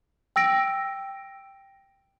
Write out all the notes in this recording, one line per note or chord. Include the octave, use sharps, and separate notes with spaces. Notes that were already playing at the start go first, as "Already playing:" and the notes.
G5 E6 A#6 D7